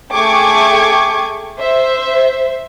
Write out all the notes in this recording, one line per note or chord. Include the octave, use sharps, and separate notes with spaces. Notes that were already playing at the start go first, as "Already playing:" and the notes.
A3 G#4 G5 C#6 D6 G#6
C5 E5